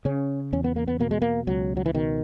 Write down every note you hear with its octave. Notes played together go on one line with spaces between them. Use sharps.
C#3 C#4
E2 C#4
B3
A#3
B3
B2 A#3
G#3
A#3
C#2 F#3
F#3
E3
B2 D#3